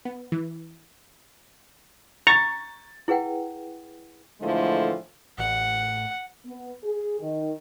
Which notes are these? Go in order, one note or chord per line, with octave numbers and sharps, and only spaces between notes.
B3
E3
A#5 C#6 A6
E4 G#4 B4 F#5 G5
A2 D3 E3 F3 G#3 A3
A1 F#5
B3
G#4
D#3